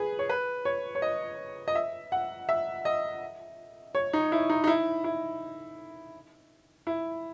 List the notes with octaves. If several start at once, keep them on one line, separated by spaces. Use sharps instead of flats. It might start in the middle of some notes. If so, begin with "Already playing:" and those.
Already playing: G#4 B4
C#5
B4
C#5
C#5
D#5
D#5
E5
F#5
E5
D#5
C#5
D#4
E4
D#4
D#4
E4
E4
E4